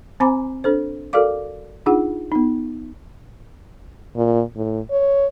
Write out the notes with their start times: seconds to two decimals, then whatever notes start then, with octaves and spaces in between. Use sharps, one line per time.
0.20 C4 C5 G#5 A#5 B5 D6
0.64 D4 A4 C5
1.13 F#4 A4 A#4 D5 F5 D6
1.86 D4 D#4 F4 G#4 F#5
2.32 B3 D#4
4.16 A#2
4.56 A2
4.90 C#5